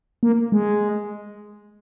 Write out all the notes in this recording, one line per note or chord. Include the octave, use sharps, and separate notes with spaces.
A#3
G#3